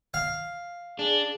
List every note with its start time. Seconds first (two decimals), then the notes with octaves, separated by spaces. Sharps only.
0.14 F5
0.99 D4 G#4